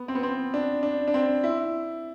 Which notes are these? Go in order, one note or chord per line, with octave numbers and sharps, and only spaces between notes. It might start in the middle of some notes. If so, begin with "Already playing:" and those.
Already playing: B3
C4
B3
C4
D4
D4
D4
C4
E4